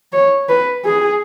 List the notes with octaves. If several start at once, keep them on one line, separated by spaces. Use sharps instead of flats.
C#5
B4
G#4